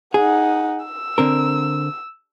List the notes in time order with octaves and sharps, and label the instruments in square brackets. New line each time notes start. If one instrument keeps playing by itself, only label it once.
[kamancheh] D#4 F#5 [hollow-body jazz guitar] G#4
[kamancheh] E6
[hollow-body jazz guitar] D3 C4 A#4